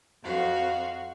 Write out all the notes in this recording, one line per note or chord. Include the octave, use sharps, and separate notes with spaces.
F2 F#4 F5